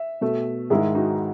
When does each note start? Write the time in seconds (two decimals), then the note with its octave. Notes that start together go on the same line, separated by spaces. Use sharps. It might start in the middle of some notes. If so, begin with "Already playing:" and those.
Already playing: E5
0.21 B2 A3
0.70 G#2 D#3 G#3 E4 G#4
0.95 D#4 F#4